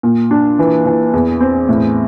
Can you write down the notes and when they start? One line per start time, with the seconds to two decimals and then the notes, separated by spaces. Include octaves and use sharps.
0.03 A#2
0.31 D4
0.59 E3
0.86 E3
1.13 E2
1.41 C4
1.69 A2